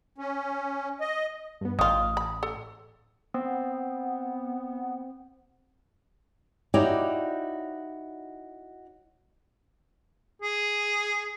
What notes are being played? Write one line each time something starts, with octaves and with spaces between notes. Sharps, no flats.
C#4
D#5
G2 B3
A1 D#3 F4 D#6
B5
A4
B3 C4
D#4 E4 F#4 G4 C#5 D5
G#4